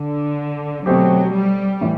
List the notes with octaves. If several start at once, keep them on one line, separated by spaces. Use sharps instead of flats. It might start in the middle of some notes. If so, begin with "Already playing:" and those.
Already playing: D3
B2 F#3 A3 C4 G4
G3
A2 E3